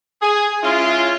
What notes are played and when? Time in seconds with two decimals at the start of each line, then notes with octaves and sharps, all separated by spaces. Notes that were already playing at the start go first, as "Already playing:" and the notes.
0.21 G#4
0.63 G#3 C#4 E4 F4